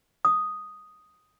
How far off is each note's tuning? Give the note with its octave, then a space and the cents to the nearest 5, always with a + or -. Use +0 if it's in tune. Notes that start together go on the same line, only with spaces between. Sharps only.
D#6 +0